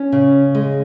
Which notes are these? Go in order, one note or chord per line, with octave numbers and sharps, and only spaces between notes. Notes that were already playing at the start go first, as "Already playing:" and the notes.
Already playing: C#4
C#3
G#3